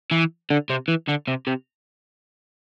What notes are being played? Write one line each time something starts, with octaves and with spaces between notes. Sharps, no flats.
E3
D3
C3
E3
D3
C3
C3